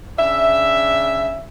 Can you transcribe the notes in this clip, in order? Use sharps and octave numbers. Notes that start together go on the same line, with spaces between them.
C#3 D4 E5